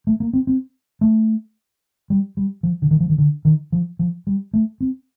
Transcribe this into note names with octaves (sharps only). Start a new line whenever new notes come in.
A3
A#3
C4
C4
A3
G3
G3
F3
D3
D#3
F3
D#3
D3
D#3
F3
F3
G3
A3
C4